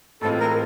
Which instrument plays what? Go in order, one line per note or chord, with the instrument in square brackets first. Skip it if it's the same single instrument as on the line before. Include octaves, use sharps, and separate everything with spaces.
[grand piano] A2 E3 G#3 C4 F4 [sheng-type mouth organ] A4
[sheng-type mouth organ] A#4